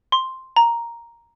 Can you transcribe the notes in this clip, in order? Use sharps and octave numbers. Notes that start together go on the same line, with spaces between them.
C6
A#5